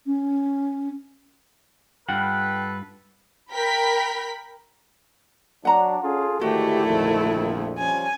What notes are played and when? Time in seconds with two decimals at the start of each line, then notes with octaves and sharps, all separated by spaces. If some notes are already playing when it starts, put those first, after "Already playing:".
0.06 C#4
2.09 G2 F4 A4 B4 F#5 G5
3.52 A#4 G5 B5 B6
5.65 F#3 D4 F#5 A#5
6.03 C#4 F4 G#4 A4
6.41 G#2 D3 D#3 A3 E4 F#4 G4
6.86 A#1 F2
7.78 F3 G3 C#4 G#5